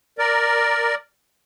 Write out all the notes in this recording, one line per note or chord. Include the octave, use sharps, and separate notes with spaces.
A#4 D5